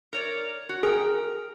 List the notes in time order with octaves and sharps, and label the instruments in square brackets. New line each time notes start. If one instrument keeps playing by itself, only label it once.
[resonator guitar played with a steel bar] A#4 C#5 D5
F#4
[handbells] G#4 [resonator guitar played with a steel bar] A#4 G5